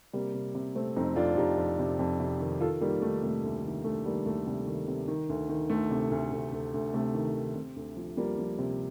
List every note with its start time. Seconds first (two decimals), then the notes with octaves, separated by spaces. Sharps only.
0.13 C3 G3 A#3
0.34 C3
0.55 C3
0.75 C3 A3 C4
0.96 F2 C4 D#4
1.16 F2 D4 F4
1.37 F2 D#4 G4
1.58 F2
1.79 C3
1.99 F2
2.20 C3
2.40 D#3
2.60 D#3 F4 A4
2.81 D#3 G3 A#3
3.02 D#3 A3
3.22 C3 A3
3.43 D2
3.64 D#3
3.84 D2 A3
4.05 D#3 G3 A#3
4.26 D2 A3
4.47 C3 G3
4.67 D#3
4.88 C3
5.08 D#3
5.29 D2
5.49 D#3
5.70 D2 A3
5.91 C3
6.11 D2
6.32 D2
6.53 D2
6.74 D2
6.94 C3 A3
7.14 D#3
7.35 D#3
7.55 C3
7.76 D2
7.97 F3
8.17 F3 G3 A#3
8.38 F3
8.59 C3